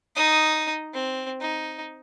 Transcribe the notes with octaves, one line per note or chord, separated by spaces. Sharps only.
D#4 D#6
C4
D#4